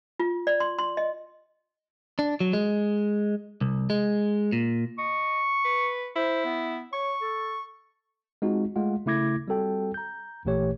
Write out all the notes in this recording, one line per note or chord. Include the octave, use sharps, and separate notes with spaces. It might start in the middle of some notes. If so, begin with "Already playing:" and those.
F4
D5
C6
C6
D#5
D4
F#3
G#3
C2
G#3
A#2
D#5 C#6
B4
E4 C5
B3
C#5 C#6
A4
G#3 C4 D#4 F4 F#4
G#3 A3 F4 F#5
C#3 A3 E4 D6 G#6 A#6
G3 C4 F#4 A4 G5
A#5 G6
A1 A#2 E3 A3 G4 C#5